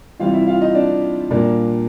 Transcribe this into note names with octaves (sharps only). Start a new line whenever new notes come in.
C3 E3 G3 F4 F5
E4 E5
F4 F5
D#4 D#5
D4 D5
A#2 G3 A#3 D4 D5